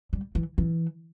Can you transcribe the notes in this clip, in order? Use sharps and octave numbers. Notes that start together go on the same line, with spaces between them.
G3
E3
E3